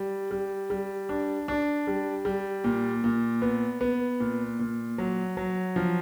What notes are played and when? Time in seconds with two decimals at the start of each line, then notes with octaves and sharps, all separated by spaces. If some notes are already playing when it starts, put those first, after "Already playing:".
Already playing: G3
0.31 G3
0.70 G3
1.09 D4
1.48 D4
1.87 G3
2.25 G3
2.64 A#2
3.04 A#2
3.42 B3
3.81 B3
4.20 A#2
4.59 A#2
4.98 F#3
5.37 F#3
5.76 F3